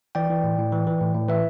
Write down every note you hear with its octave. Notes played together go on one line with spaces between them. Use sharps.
E3 D5 G5
E3
A2
A2
E3
E3
A2
A2
E3 B4 E5